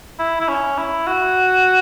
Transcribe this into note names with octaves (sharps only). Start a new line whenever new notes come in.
E4
E4
C#4
E4
F#4